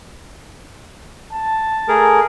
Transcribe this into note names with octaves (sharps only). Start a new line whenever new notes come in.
A5
A3 G#4 A#4